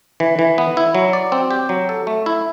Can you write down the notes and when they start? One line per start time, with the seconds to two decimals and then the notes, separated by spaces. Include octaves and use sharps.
0.20 E3
0.39 E3
0.58 B3
0.77 E4
0.94 F#3
1.13 D5
1.32 C4
1.51 G4
1.69 F#3
1.89 A4
2.07 A3
2.26 E4